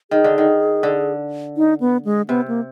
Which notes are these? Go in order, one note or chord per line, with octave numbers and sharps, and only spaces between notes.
D#3 G#4
D3
D#3
D3
D#4
B3
G#3
C3 B3
A#3